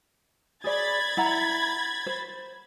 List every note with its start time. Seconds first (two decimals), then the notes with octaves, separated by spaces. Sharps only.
0.64 G#4 C5 D5 B5 G#6 A6
1.17 E4 F#5 A#5
2.06 C5